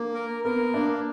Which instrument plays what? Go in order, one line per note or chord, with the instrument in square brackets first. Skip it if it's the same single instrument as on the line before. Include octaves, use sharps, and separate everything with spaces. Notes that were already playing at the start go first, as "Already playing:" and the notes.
Already playing: [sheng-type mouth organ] A#3 [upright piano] D4
[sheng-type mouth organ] A#4
[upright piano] B3 [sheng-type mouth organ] A#4
[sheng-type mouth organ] A#3 [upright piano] D4